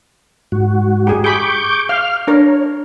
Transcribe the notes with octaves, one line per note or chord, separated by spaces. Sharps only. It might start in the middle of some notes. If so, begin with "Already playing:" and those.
G#2 F#4
G4 G#4
G#4 B5 C#6 D6 G6
F5 F6
D4 A#4 C#5